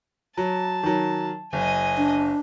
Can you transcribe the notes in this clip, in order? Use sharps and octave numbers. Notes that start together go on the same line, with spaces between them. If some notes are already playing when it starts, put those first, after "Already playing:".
F#3 A5
D#3 F#3
F#1 D#5 G#5
D4